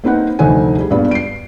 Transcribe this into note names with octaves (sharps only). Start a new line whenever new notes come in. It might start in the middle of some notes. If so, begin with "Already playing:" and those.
A#3 C4 D#4 B4 F#5
F1 D2 D#4 C5 F#5 G#5
G3 G#4
G2 A#2 G3 G#3 B3 D4
C7 D7